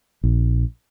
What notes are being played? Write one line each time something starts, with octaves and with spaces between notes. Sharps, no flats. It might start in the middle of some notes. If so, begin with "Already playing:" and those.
A#1